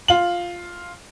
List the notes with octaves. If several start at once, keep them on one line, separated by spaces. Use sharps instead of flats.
F4 F#7